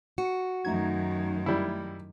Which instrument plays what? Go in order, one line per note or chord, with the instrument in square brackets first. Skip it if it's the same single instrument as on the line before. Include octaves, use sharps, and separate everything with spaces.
[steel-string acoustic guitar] F#4 [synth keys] C#7
[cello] F#2 D#3 [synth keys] A3 D#4 G#6
[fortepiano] G3 E4